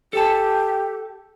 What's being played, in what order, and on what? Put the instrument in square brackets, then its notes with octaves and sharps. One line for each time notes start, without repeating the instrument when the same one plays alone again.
[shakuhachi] G4 [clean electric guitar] A4 A5